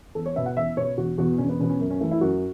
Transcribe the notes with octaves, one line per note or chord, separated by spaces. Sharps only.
E2 A4
C#5
B2 B3 E5
F#5
E2 E5
B2 B3 C#5
E1 F#4
E2 B2 B3 F#4
E1 C#4
B3
E2 B2 B3 C#4
C#4
F#2
C#4
E3 A3
E4
F#2 F#4